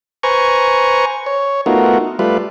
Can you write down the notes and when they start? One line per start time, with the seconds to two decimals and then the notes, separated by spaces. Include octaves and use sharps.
0.23 B4 C5 G#5 A#5 C#6
1.26 C#5
1.66 A3 B3 D#4 F4 F#4 A#4
2.19 G3 A3 F4 B4